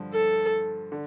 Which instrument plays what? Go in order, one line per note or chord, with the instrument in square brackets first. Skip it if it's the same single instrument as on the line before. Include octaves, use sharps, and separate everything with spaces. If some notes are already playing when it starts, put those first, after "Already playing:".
Already playing: [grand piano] G2 D3 F3
[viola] A4
[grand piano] D3